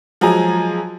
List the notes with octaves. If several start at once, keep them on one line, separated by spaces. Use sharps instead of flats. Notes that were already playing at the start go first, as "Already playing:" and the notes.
F3 F#3 G#3 G#5 A#5